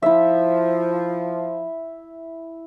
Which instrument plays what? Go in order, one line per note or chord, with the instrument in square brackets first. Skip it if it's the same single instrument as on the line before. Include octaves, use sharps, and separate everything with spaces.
[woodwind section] F3 [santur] E4 E5